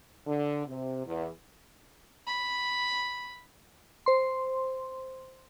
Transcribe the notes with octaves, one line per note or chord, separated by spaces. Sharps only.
D3
C3
E2
B5
C5 C6